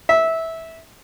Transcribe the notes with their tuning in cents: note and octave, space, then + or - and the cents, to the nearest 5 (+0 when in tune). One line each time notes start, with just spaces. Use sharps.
E5 -15